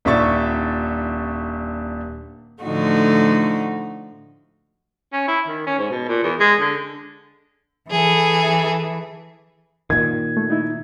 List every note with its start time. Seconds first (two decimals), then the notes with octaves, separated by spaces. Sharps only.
0.05 D#1 D4 E5 C#6 A6
2.63 A2 D3 F3 A3 D#4 F#4
5.13 C#4
5.28 E4
5.48 D#3
5.67 C#4
5.78 G#2
5.91 B2
6.08 A#2
6.23 E2
6.40 G#3
6.60 D3
7.91 E3 G#4 A4
9.90 A#2 D#3 G#6
10.37 A3
10.50 D#4 E4